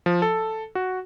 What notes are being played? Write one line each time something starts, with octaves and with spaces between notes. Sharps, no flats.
F3
A4
F#4